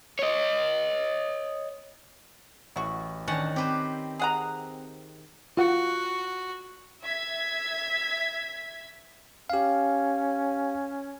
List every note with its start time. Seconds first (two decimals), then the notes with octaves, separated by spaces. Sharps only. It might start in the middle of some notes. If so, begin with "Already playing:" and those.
0.19 C#5 D#5
2.76 A1 E4 F#4
3.28 D#3 C#4 D4 F#5 A5
3.56 C4 G4 B4 C5
4.19 G#4 F#5 A#5
5.57 F4 F#4 F#5
7.04 E5 G#6 B6
9.50 C#4 G4 F5